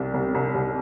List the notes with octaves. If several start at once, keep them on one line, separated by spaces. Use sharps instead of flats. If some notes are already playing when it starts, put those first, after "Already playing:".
Already playing: C2 G3
C2
C2
C2